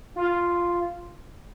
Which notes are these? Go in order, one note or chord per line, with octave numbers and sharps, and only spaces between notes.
F4